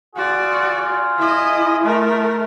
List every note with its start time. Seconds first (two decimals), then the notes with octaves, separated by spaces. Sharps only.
0.16 F4 F#4 G#4 D5
1.18 E4 D#5
1.84 A3 A#4